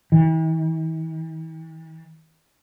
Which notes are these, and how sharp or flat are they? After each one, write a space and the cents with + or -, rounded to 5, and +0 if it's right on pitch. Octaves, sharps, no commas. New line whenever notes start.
E3 -45